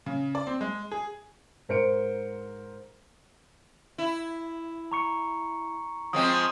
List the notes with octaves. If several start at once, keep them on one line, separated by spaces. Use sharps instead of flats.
C#3
D5
C4
G#3
G#4
G#2 A#4 C5 C#7 D7
E4
A#5 C#6 C#7
F3 G#3 C4 D#6